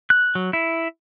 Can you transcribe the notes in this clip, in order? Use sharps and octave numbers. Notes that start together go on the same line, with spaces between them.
F#6
F#3
E4